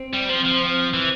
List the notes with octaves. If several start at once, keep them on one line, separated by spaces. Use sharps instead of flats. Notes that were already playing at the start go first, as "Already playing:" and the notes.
Already playing: C4
G3
F3 C4
F3
C4
E3